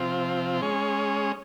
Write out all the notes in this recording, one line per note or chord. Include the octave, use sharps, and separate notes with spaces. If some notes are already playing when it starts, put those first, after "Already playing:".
Already playing: C3 F3 C4 F4
G#3 C#4 G#4 C#5